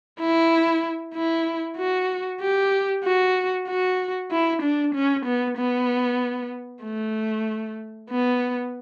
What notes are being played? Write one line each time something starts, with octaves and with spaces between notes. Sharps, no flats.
E4
E4
F#4
G4
F#4
F#4
E4
D4
C#4
B3
B3
A3
B3